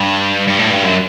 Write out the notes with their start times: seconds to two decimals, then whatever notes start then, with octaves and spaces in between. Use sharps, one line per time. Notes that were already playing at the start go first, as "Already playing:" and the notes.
Already playing: G2
0.48 G2
0.59 A2
0.70 G2
0.84 F#2